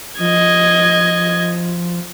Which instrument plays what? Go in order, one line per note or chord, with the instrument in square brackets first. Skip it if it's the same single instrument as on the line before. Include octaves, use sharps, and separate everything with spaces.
[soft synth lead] F3 [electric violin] D#5 G#6